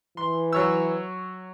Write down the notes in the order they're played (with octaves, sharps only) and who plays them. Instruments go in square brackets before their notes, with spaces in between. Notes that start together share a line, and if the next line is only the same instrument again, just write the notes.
[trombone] E3 [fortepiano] C6
[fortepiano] F#3 C#5 E6